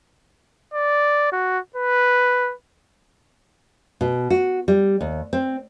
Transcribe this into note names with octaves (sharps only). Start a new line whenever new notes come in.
D5
F#4
B4
B2
F#4
G3
D#2
C4